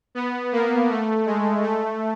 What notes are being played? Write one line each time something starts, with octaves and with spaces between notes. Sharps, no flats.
B3
A#3
A3
G#3
A3